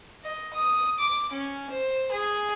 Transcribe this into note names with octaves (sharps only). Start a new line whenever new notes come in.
D#5
D#6
D6
C#4
C5
G#4